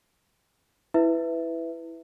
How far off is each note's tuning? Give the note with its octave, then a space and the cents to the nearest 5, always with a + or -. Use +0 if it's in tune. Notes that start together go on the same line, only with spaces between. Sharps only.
E4 +0 B4 +10 E5 +0